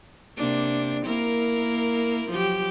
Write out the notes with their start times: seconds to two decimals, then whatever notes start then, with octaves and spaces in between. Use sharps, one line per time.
0.37 C3 A#3 D4
1.05 A#3 E4 A#4
2.30 F3 F#3 G4